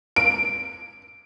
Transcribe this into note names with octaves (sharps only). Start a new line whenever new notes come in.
D7